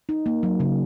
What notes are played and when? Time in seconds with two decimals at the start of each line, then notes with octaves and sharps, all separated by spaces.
0.09 D#4
0.26 A#3
0.43 F#3
0.60 C#3